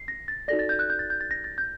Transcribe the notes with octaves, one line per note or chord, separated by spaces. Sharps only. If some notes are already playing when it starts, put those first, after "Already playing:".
Already playing: C7
A#6
A6
D#4 F#4 A4 D5 A#6
A6
G6
F#6
G6
A6
G6
A6
A#6
A6
G6